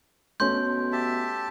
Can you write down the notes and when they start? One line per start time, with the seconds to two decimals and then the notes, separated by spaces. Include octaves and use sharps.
0.40 B2 A3 C#4 C6 G6
0.92 G4 E5 A5